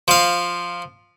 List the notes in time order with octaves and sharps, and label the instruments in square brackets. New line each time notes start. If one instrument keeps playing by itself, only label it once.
[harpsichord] F3 F5